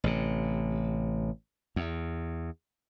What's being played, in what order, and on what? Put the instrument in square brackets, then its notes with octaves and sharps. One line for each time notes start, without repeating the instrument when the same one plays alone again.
[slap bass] A1 C3
E2